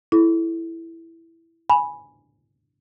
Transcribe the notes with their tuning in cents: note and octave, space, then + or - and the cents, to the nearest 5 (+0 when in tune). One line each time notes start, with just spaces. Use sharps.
E4 +5 A4 -25
G#5 +0 B5 -10